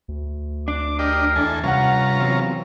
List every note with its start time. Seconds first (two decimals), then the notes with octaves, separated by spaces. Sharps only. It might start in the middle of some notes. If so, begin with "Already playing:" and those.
0.08 D2
0.68 D4 D6
0.99 G4 A#4 D5 D#5
1.36 E2 A4 G#5
1.63 G2 C3 C#4 F4 F#5 A#5
2.21 E2 F#3 C4